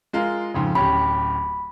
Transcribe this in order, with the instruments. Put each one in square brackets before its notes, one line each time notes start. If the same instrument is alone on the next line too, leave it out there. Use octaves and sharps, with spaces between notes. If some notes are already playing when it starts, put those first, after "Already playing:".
[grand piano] G#3 F4 A#4
F2 G#2 C#3
[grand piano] D1 C#4 G4 [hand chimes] B5